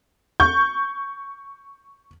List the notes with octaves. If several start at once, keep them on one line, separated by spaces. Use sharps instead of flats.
C#6 G6